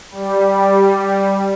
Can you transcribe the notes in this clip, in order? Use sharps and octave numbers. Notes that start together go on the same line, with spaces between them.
G3